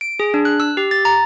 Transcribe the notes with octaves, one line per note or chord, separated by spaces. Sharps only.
D7
G#4
D4
F#6
E6
G4
A6
A#5